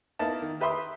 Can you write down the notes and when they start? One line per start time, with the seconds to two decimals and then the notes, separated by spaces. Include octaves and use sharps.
0.19 A#3 B3 D#4 E4 A5
0.42 D#3
0.61 G4 B4 E5 B5 C6 D#6